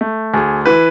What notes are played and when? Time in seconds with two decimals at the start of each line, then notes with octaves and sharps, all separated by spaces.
0.01 A3
0.34 D2 G#4
0.66 E3 B4